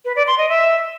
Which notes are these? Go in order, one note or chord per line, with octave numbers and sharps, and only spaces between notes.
B4
D5
C6
D#5
E5